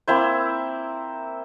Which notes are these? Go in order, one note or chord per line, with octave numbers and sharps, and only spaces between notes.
A#3 C4 E4 C5